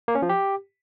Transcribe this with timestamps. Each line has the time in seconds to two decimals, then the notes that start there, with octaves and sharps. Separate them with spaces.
0.08 A#3
0.15 C#4
0.22 F3
0.29 G4